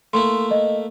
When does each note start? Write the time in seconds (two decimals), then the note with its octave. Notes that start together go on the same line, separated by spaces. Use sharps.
0.13 A3 A#3 E4 C6
0.51 D#5